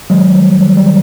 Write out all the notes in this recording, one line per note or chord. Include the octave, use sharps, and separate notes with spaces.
D#3 F#3 G#3
D#3 G3
D#3 G3
G3
D#3